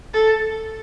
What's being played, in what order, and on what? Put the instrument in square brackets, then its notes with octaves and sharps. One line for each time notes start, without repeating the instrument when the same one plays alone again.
[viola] A4